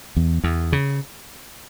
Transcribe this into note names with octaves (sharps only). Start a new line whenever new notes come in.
E2
E2
C#3